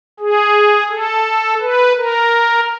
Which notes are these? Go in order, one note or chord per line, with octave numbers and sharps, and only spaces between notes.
G#4
A4
B4
A#4